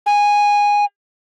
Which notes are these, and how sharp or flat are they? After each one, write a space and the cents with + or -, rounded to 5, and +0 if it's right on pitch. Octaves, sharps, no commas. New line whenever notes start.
G#5 -10